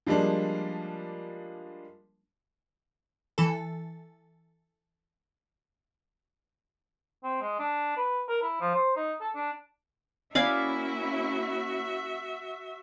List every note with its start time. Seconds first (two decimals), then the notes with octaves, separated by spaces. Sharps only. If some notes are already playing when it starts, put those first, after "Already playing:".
0.06 F3 G3 G#3 A#3 D4
3.38 E3 A4
7.23 C4
7.41 G#3
7.59 D4
7.97 B4
8.29 A#4
8.42 E4
8.61 F3
8.74 C5
8.96 D#4
9.20 A4
9.35 D4
10.35 A#3 C#4 E4 F#4 D5 E5 F5 G#5